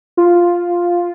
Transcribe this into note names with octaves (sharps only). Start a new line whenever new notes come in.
F4